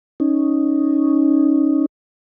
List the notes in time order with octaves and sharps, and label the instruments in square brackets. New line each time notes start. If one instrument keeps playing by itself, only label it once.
[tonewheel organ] C#4 D#4